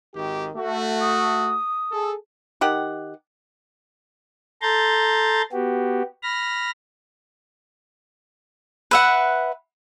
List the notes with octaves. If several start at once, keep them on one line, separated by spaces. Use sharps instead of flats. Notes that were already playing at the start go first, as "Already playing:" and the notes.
G#1 D#3 G4
A3 F#4
D#6
G#4 A4
D#3 G4 F#5
A4 A#5 C6 G6 A6
B3 F#4 G4
B5 F6 A#6
B4 E5 F#5